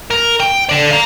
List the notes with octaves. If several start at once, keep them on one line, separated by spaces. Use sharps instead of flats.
A#4
G5
A4 D5
F5 A#5